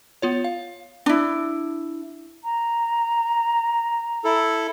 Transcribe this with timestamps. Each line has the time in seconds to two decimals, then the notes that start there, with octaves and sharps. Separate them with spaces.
0.22 B3 F4 C#5
0.44 F5
1.06 D4 E4
2.43 A#5
4.25 E4 A4